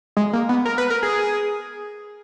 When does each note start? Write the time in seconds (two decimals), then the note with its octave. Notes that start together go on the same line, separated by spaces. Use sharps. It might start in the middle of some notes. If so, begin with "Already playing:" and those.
0.17 G#3
0.33 A#3
0.49 B3
0.65 A#4
0.78 B4
0.90 A#4
1.03 G#4